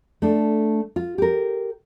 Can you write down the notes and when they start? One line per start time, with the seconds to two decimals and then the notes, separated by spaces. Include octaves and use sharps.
0.22 A3 D4
0.96 F4
1.18 G4 A#4